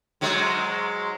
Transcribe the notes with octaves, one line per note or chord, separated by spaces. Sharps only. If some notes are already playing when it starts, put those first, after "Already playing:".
G#2 F#3 G#3